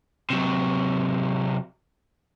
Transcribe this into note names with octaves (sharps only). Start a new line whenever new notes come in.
C3 F#3